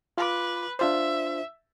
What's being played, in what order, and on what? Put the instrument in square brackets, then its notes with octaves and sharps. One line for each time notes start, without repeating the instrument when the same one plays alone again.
[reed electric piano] F4 D6 [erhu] B4
[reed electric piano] D4 F4 C5 [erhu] E5